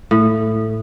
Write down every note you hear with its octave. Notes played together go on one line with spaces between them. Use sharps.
A2